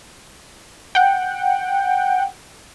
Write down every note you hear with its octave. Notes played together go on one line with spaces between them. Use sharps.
F#5 G5